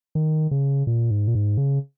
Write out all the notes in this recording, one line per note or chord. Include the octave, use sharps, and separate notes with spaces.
D#3
C#3
A#2
G#2
A#2
G#2
C#3